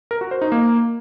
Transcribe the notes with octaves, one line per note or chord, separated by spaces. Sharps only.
A#4
F#4
C5
D#4
A#3